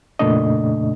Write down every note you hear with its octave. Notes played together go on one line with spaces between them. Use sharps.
F2 A#2 C#3 A3 D4 D#5